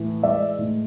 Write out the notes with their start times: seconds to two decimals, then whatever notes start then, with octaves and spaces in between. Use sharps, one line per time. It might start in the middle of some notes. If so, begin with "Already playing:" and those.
Already playing: A2 E3
0.22 G#3 D5 E5
0.58 A2